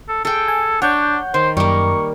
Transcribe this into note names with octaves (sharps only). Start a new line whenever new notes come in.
A4
G#4 A4 G5
G#5
D4 C#5 F#5 G6
D#3 C5
F#2 G3 A#3 C#6